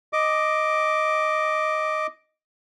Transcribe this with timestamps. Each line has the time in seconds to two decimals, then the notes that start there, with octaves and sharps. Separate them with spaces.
0.13 D#5 D6